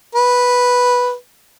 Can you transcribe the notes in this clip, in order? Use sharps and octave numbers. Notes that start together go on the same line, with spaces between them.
B4